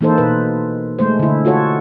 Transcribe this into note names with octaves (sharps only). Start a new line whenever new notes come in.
E3 A#3 D#4 A4 C5
B2 B4
G#3 A3 C5
D3 E4
F4 F#4 A4 C#5